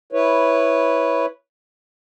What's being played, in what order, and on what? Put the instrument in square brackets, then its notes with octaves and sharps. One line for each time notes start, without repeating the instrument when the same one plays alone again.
[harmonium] E4 B4 C#5